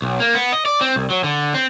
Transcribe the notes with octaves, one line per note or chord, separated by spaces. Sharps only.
B1
A#3
B3
D#5
D5
C4
C2
F#3
D3
C4